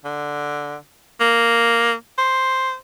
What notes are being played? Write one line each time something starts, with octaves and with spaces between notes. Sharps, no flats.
D3
A#3
C5